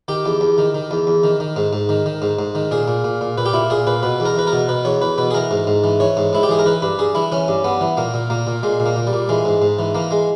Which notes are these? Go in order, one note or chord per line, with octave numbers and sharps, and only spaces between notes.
D#3 G4
E2
E2
D#3
D#3
E2
E2
D#3
D#3
G#2
G#2
D#3
D#3
G#2
G#2
D#3
A#2 G#4
A#2
A#2
A#2
A#2 B4
G4
A#2 E4
A#2 G#4
A#2 B4
B2 B4
E2
A#4
E2 B4
A#4
B2
B2 B4
E2 C#5
E2 B4
B2 B4
G#4
E3 A#4
G#2
G#2
E3
E3 C#5
G#2
G#2 E4
G4
E3 G#4
A#4
E3 B4
G2 B4
G2 G#4
E3 E4
E3 C#4
G2
G2 B3
E3
A#2 A#3
A#2
A#2 A#3
A#2
A#2 G#3
A#2
A#3
A#2
G3
A#2
E3 G#3
G#2
G#2
E3
E3 A#3
G#3